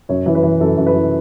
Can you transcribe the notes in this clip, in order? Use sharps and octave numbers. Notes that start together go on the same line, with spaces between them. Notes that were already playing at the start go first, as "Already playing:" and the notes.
F#2 C#5
E3
B4
E3
F#2 A4
F#2
B4
E3